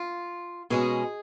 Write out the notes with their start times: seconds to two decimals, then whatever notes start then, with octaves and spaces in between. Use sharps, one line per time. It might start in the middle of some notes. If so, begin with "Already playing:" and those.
Already playing: F4
0.70 B2 G#3 C#4 G#4